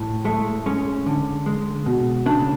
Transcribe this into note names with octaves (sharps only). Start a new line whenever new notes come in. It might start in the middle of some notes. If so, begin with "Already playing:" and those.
Already playing: A2
G#3 A3
G#3 C#4
D3
G#3
B2
C#3 D4